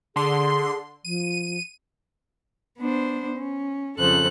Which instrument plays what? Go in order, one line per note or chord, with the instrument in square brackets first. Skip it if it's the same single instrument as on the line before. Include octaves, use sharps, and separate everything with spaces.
[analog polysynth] D3 C6 [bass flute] G#4
[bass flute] F3 [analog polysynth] D#7
[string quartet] B3 D4 C5
C#4
F2 C#3 F3 A4 C5 F#6